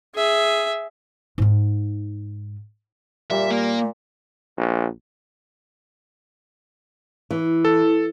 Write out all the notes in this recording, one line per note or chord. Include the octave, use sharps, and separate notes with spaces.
G#4 E5
G#2 D#4
A#2 G3 E5
A#3
A#1
E3
A4